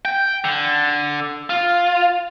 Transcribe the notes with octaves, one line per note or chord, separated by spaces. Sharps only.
G5
D3
F4